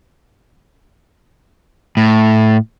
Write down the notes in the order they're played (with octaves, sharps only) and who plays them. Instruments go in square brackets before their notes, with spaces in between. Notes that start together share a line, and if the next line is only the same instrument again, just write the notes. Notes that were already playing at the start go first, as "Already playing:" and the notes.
[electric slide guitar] A2